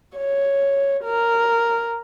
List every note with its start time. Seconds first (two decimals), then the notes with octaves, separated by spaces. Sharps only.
0.17 C#5
1.05 A#4